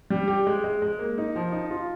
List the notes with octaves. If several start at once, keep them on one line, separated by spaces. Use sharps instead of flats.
G3
G4
G#3
G#3
G#3
A#3
D#4
F3
D#4
F4